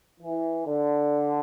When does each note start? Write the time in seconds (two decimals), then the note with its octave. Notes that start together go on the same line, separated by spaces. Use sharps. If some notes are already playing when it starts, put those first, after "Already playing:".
0.21 E3
0.66 D3